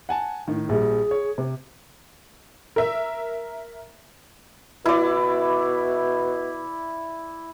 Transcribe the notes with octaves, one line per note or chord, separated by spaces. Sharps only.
F#5 G#5 A5
A2 D#3
A#1 G3 G#4
C#5
C3
A#4 E5
B2 E4 D5